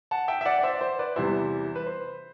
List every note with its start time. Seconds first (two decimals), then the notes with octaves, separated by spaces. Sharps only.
0.11 F#5 A5
0.28 E5 G5
0.41 E5
0.45 D5 F#5
0.59 D5
0.63 C5 E5
0.74 D5
0.81 C5
0.99 B4 D5
1.16 E2 C3 E3 G3 C5 E5
1.75 B4
1.87 C5